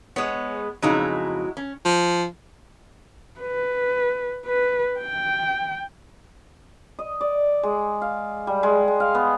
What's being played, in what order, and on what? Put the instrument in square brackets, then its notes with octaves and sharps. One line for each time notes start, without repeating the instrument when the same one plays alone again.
[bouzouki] G#3 B3 [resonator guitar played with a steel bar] C#5
[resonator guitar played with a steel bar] F2 C#3 D#4 [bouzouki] F#3 G#3 E4
[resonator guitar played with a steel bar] C#4
[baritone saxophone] F3
[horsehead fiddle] B4
B4
G5
[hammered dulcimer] D#5
D5
G#3
F5
G3
G#3
G#3
F5
B3